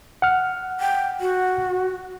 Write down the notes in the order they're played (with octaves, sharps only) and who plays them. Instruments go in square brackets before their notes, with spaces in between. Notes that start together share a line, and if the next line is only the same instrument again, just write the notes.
[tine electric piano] F#5 F6
[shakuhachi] G5
F#4